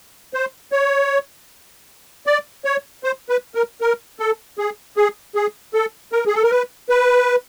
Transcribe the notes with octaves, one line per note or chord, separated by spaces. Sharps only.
C5
C#5
D5
C#5
C5
B4
A#4
A#4
A4
G#4
G#4
G#4
A4
A#4
G#4
A4
A#4
B4
B4